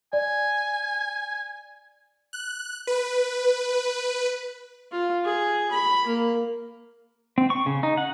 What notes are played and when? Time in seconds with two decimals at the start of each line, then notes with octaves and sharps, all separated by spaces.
0.13 D5 G#5
2.33 F#6
2.87 B4
4.92 F4
5.25 G#4
5.71 B5
6.06 A#3
7.38 C4
7.50 C#6
7.66 C#3
7.83 D#4
7.97 F#5